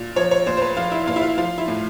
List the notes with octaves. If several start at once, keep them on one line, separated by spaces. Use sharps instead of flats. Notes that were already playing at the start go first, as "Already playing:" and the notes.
Already playing: A#2
F3 C#5
C#5
A#2 C5
C5
B4
F3 F4
E4
A#2 F4
E4
F4
F3 F4
E4
A2